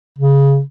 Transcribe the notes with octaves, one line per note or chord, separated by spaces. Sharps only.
C#3